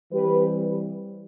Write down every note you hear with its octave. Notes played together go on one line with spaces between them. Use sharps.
E3 G3 C4 G4 B4